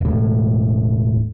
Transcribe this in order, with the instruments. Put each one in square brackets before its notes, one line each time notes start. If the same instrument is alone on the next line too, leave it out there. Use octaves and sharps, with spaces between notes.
[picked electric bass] E1 A2